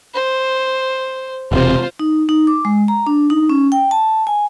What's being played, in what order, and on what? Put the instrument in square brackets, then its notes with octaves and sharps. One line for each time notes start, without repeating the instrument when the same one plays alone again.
[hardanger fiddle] C5
[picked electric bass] E1 C3 [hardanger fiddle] F4 C5
[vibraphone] D#4
D#4
D6
G#3
A#5
D4
D#4
C#4
G5
A5
G#5